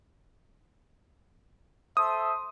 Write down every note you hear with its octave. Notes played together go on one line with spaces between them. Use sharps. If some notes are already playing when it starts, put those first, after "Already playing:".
A4 C5 E5 D#6